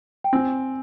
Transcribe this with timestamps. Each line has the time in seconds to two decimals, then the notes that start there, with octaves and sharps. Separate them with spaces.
0.24 G5
0.33 C4 G#5